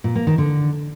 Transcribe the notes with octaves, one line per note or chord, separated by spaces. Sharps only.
A#2
A#3
D#3
D3